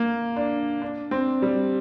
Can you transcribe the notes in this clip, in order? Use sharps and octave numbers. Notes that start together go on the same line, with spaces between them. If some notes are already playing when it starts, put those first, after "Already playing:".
Already playing: A#3
D4
D4
C4
G3